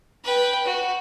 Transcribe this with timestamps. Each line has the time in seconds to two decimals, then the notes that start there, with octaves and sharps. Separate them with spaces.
0.24 B4 G5
0.66 F#4